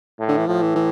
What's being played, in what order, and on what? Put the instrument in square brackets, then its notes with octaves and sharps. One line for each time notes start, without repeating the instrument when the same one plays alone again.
[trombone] A2
[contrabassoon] D3
E3
[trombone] A2 [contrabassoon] F3
[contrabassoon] E3
E3